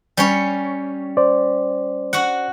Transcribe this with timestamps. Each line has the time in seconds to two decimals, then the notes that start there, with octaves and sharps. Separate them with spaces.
0.17 G3 C#4 C#5
1.17 C5 D5
2.13 F#4 F#5